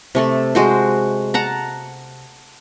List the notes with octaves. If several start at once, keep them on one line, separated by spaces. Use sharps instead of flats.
C3 A3 A4
G#3 F#4 C5
F#5 A5 A#5